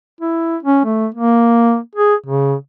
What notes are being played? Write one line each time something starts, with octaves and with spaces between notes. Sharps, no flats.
E4
C#4
A3
A#3
G#4
C#3